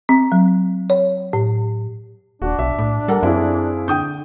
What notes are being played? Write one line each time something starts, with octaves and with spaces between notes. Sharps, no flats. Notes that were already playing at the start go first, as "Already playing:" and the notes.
C4
F#3
C#5
A2
D#1 D4 F#4
B1 E5
A2
G3 A4 A#4 F#5
F#2 C4 E4 G#4 F5
D3 G5 D#6 G6